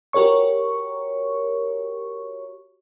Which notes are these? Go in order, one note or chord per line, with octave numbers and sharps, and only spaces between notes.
F#4 G4 A#4 C#5 C#6